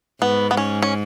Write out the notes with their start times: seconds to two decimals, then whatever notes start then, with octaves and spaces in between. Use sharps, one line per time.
0.22 G#2 B3
0.51 B3
0.57 C#4
0.82 C#4